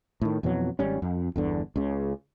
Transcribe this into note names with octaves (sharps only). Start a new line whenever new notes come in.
A2 D#3
F2 B2 E3 F#3
G#1 G3 C#4
F2
G1 E2 D3
C#2 C#3